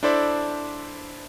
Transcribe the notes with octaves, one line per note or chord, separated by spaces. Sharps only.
D4 E4 A4 C5 D5 E5